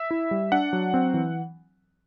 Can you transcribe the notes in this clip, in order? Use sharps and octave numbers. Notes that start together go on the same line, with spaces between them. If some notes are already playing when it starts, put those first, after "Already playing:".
Already playing: E5
E4
G3
D4 F#5
F#3
C4
E3